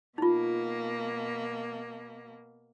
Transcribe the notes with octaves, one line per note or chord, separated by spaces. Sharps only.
B2 A#3 D#4 F4